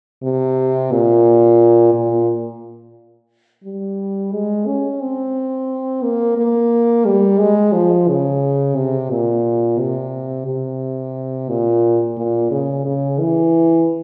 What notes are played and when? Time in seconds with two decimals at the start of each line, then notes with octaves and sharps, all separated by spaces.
0.23 C3
0.92 A#2
1.94 A#2
3.64 G3
4.32 G#3
4.67 C#4
5.02 C4
6.03 A#3
6.37 A#3
7.06 G3
7.39 G#3
7.73 F3
8.09 C#3
8.76 C3
9.10 A#2
9.79 C3
10.46 C3
11.49 A#2
12.18 A#2
12.51 C#3
12.85 C#3
13.20 E3